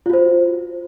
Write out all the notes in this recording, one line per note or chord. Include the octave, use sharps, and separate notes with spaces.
F4 F#4 C5